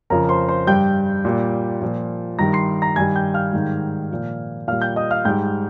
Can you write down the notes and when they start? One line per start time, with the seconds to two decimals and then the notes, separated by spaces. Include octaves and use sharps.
0.10 F2 C#3 F3 A#4 A#5
0.29 C5 C6
0.49 C5 C6
0.67 G2 G3 G5 G6
1.25 A#2 G3
1.82 A#2 F3
2.39 G2 D#3 G3 A#5 A#6
2.53 C6 C7
2.82 A#5 A#6
2.96 G2 D#3 G3 G#5 G#6
3.15 G5 G6
3.34 F5 F6
3.53 G#2 D#3 G3
4.11 A#2 F3
4.68 A#2 G3 F5 F6
4.82 G5 G6
4.96 D#5 D#6
5.11 F5 F6
5.25 G#2 G3 G5 G6